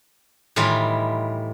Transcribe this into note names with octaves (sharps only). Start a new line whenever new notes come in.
A2 D#3 E3 G3 F4